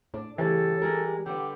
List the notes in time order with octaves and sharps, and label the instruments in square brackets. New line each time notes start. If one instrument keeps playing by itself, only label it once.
[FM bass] A2 [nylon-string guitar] D4
[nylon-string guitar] G2 C#3 A3 [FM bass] E3 [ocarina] G4 [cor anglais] A4
[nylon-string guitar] G3 G#3 A#4
[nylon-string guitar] D3 G3 B3 [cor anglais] G4